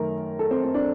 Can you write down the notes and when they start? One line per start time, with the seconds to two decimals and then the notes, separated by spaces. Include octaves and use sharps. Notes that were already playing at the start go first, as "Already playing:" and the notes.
Already playing: F#2 D#3 A3 A#4
0.39 A4
0.51 C4
0.64 C4
0.74 D4